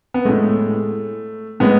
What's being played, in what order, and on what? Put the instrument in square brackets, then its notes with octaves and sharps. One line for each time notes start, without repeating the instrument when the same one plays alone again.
[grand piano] B3
A2 G#3 A3
A2 G#3 B3